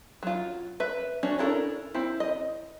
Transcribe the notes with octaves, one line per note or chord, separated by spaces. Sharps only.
F#3 F4
B4 E5
C#4 D4 F#4 C#5
D4 E4 A4 A#4
C4 E4
D#5